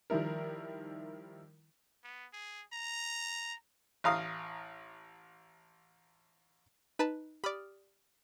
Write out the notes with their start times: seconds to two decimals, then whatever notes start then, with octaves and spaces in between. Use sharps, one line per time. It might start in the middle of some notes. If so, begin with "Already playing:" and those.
0.10 D#3 F3 G3 E4 A#4
2.04 B3
2.33 G#4
2.73 A#5
4.04 A1 F5 A#5 D#6
6.99 D#4 B4 A5
7.44 G4 D5 B5 D#6 F6